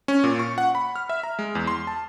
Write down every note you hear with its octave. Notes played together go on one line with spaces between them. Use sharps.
C#4
A#2
C#6
F#5
B5
F6
E5
A#5
G#3
E2
C6
A5